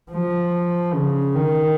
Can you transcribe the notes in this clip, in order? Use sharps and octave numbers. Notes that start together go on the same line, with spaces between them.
F3
C#3
D#3